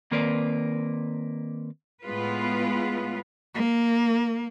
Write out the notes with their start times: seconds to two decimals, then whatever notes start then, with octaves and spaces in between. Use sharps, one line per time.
0.11 D#3 A#3 C4 A#4 B4 D5
2.04 A2 G#3 B3 F4 B4
3.55 A#3